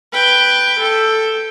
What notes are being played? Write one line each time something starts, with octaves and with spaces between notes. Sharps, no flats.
B4 G5
A4 G5